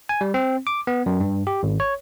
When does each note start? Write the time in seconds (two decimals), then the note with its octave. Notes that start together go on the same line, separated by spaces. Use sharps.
0.09 G#5
0.21 G3
0.34 C4
0.67 D6
0.87 B3
1.06 F#2
1.20 G2
1.47 G4
1.63 G#1
1.80 C#5